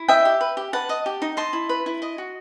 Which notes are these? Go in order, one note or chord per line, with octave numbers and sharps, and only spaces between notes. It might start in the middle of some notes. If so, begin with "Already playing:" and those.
Already playing: E4
D#5 E5 G5
G4
B4
G4
B4 F#5 A5
D#5
G4
D#4
D#5 A5 C6
E4
B4
E4
D#5
F#4